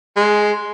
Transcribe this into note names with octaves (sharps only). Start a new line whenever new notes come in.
G#3